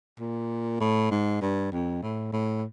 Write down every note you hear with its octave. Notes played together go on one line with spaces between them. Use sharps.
A#2
A2
G#2
G2
F2
A2
A2